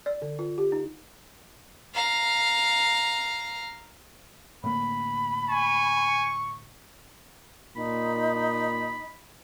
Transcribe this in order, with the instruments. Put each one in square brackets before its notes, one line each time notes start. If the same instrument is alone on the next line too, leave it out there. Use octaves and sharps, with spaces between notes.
[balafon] D5
D3
F4
G4
D#4
[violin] F5 A#5
[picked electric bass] A2 D3 A#3 [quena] B5
[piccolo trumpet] G#5 [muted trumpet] C#6
[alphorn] A#2 [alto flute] D#4 [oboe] B5